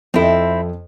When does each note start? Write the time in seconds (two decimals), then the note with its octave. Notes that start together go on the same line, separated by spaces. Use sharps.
0.14 F2 C4 E4 A4 D#5